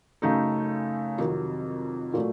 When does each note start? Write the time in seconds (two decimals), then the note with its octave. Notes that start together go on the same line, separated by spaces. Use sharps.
0.22 F#2 C#3 A3 D#4 A4
1.18 F2 C3 D#3 F#3
2.14 A#2 F#3 A3